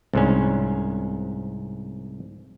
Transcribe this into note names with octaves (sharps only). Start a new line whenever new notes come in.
C2 G#2 C#4